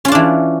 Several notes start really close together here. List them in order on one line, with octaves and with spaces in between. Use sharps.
C#4 F4 D4 E3